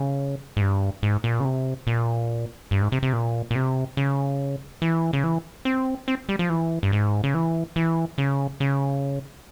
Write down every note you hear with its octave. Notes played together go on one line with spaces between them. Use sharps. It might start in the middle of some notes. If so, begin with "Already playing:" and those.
Already playing: C#3
G#2
G2
G#2
A#2
C#3
C3
A#2
G2
G#2
C3
C3
A#2
A#2
C3
C#3
E3
C#3
E3
C4
C4
G3
F3
E3
G2
G#2
C#3
E3
E3
C#3
C#3